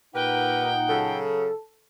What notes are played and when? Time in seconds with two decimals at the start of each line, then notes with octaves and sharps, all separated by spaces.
0.15 A#2 D#4 G4 A#4 B4 F#5 G5
0.89 C#3 F#3 A4